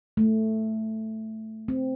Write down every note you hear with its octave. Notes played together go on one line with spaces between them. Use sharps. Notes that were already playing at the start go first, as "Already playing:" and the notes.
A3
C4